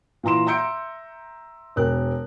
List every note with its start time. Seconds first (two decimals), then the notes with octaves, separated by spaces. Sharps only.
0.23 A#2 E3 A#5 C6 E7
0.46 E5 A#5 C6 G6 C#7 D7
1.76 E1 A#4 F#6